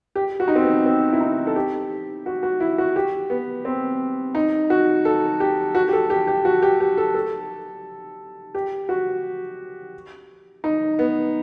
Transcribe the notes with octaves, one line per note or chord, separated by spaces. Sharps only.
G4
F#4
D#4
C4
B3
C4
E4
D#4
A4
G4
F#4
F#4
E4
F#4
G4
B3
C4
D#4
F#4
A4
G4
F#4
G4
A4
G4
G4
F#4
G4
G4
A4
A4
G4
F#4
D#4
B3